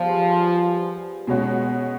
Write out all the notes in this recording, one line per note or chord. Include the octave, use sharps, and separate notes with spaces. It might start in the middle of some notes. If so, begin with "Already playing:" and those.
Already playing: F3 G3 B3 G#4 C5
B2 G#3 C#4 F#4